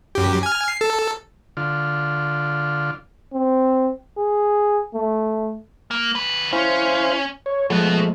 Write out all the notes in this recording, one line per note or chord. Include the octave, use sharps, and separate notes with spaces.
F#2 G4
G#5 F6
C7
A4
D3 F4
C4
G#4
A3
A#3
D2 B4
C#4 E4 C5 F5
C#5
B2 F3 G#3 A3 B3